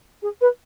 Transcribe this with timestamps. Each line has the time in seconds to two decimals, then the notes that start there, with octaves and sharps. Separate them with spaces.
0.22 G#4
0.41 B4